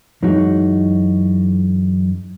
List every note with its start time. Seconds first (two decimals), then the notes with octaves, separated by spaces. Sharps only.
0.23 F#2 E3 G#3 D#4 F#4